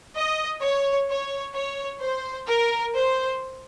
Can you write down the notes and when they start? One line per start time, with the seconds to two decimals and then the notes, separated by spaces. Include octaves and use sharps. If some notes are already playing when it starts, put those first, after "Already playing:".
0.15 D#5
0.62 C#5
1.09 C#5
1.54 C#5
2.01 C5
2.48 A#4
2.94 C5